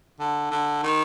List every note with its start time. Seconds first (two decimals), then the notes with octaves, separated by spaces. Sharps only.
0.19 D3
0.51 D3
0.83 D#3